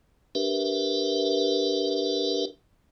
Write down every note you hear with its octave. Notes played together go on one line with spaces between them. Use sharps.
D4 G4 A#4 B4 E5